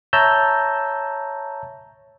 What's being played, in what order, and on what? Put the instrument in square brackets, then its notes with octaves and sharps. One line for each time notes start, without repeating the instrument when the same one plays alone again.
[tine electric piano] C#5 E5 A5 A#5 E6 G6